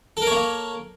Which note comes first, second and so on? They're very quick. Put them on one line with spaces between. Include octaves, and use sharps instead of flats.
A4 A#4 C#5 A#3